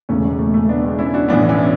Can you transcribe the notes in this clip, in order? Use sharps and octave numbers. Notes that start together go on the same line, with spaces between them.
E1 E2 C#3 A3 C#4
G#3
A3
A3
B3 D4
G#3
C#4 E4
D4 F#4
B1 A2 E3 B3 D4
C#4 E4